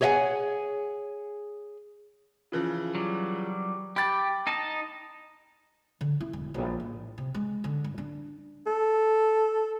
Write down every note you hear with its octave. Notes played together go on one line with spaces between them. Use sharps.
G#4 C#5 D#5 E5 F#5 G#5
C#3 E3 F3
F#3 G3
G4 B5 A6
D#4 D#5 A5
D3
E4
E1
A#1
A1
C3
G#3
D3
G2
D4
A4